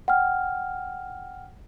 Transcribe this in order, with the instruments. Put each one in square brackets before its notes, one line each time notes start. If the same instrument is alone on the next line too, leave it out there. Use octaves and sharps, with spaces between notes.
[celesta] F#5 G5 F6